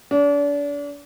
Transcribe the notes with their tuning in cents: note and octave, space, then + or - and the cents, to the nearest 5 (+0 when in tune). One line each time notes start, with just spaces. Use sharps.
D4 -35